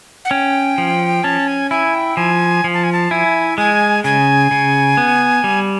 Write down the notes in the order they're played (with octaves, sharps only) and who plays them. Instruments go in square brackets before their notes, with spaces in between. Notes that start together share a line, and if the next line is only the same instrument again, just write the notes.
[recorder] F#5
[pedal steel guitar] C#4 [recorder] G5
[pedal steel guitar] F3
[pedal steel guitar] C#4 [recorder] A5
[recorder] G#5
[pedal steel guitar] E4 [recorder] G#5
[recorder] G5
[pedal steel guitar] F3 [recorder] G#5
[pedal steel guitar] F3
[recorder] A5
G#5
A5
[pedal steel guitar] E4 [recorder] G#5
[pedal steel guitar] G#3 [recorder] G#5
[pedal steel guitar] C#3 [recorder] G#5
[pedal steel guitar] C#3
B3
G3